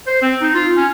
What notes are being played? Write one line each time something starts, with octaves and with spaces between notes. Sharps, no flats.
C5
C4
D#4
F4
C#4